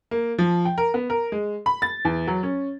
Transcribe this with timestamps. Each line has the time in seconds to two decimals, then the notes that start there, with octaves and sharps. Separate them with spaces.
0.11 A#3
0.39 F3
0.65 G5
0.78 A#4
0.94 B3
1.10 A#4
1.32 G#3
1.66 B5
1.82 A6
2.05 E2
2.27 F#3
2.43 C#4